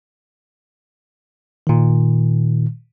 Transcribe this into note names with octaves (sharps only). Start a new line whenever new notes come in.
A#2 D#3